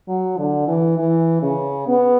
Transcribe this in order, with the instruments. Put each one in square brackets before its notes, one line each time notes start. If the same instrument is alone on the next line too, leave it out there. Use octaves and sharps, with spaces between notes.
[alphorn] F#3
D3
E3
E3
C#3
B3